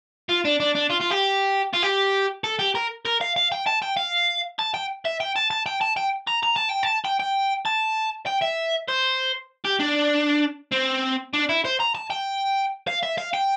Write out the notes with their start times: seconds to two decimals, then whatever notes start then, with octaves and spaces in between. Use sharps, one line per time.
0.29 F4
0.45 D4
0.60 D4
0.75 D4
0.90 F4
1.01 F4
1.11 G4
1.73 F4
1.83 G4
2.44 A4
2.59 G4
2.75 A#4
3.05 A#4
3.21 F5
3.36 F5
3.52 G5
3.67 A5
3.82 G5
3.97 F5
4.59 A5
4.74 G5
5.05 E5
5.20 G5
5.36 A5
5.51 A5
5.66 G5
5.81 A5
5.97 G5
6.27 A#5
6.43 A#5
6.56 A5
6.69 G5
6.83 A5
7.05 G5
7.20 G5
7.66 A5
8.27 G5
8.42 E5
8.88 C5
9.65 G4
9.80 D4
10.72 C4
11.34 D4
11.49 E4
11.65 C5
11.80 A#5
11.95 A5
12.10 G5
12.87 F5
13.03 E5
13.18 F5
13.33 G5